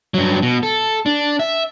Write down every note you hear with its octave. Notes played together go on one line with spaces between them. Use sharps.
G2 F#3
B2
A4
D4
E5